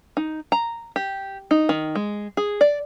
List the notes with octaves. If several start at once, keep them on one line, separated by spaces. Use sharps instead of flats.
D#4
A#5
G4
D#4
D#3
G#3
G#4
D5